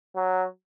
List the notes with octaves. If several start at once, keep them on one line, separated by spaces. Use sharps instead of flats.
F#3